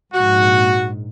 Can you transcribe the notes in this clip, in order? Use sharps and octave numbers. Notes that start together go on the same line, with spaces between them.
A#1 G#2 F#4